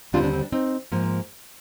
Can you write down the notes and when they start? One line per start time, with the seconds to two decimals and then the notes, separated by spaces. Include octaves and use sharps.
0.13 D#2 D3 G3 C4 D4 F4
0.23 D4
0.33 C4
0.42 D4
0.52 C4 D#4
0.92 G#2 F3 A#3